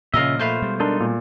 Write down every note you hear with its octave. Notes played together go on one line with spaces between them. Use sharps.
A#2 C#3 F3 F4 A#4 D#5 E5
A3 F4 B4 C5
B2 G3 G#3
D4 D#4 A4 A#4 C6
A#2